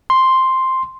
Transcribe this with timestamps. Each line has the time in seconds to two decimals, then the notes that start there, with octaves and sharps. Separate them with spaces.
0.10 C6